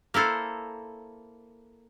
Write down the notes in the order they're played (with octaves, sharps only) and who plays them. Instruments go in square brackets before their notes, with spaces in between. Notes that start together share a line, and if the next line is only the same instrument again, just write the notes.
[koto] A#3 E4 A4 C5